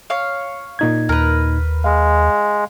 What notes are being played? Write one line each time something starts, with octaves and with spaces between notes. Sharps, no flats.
C#5 F5
A#2 D#4 G#6
D#2 A#4 B4
G#3 F5